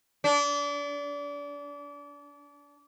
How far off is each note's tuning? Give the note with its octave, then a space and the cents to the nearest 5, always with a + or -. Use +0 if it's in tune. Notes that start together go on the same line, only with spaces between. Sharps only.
D4 -30